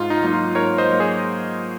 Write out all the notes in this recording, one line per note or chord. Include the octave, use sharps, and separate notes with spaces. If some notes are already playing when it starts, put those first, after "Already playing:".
Already playing: G#2 F4
D#4
F#3 A#3 D#4
F4
G#2 A#4 C#5
C5 D#5
F#3 A#3
G#4 C5